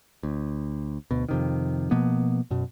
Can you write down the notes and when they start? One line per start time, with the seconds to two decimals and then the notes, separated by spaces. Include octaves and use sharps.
0.23 D2
1.11 D2 B2
1.29 F2 C3 D#3
1.91 B2 F3 A#3 B3
2.51 F#2 B2